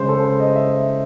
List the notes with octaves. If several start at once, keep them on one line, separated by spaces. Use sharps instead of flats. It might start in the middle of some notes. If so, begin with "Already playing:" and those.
Already playing: C#3 G#3 C#4 C5
A4
C5
D#5
E5